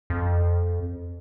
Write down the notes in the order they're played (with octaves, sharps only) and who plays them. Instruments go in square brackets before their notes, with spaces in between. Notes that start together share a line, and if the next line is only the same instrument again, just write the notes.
[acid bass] F2